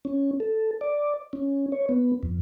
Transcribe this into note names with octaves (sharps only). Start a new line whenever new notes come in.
C#4
A4
D5
C#4
C#5
B3
F2